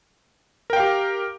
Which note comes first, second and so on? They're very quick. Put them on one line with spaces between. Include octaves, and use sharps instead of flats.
A#4 G5 F5 G4